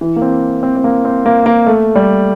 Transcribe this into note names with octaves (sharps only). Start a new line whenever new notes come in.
E3
A#3
C4
C4
C4
A#3
C4
A#3
A#3
A3
G3